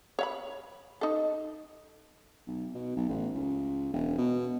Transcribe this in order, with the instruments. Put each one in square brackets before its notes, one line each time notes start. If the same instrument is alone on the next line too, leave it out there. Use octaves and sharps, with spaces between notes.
[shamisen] C#5 F5 B5
D#4 A4
[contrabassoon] B1
B2
B1
A1
C#2
E1
B2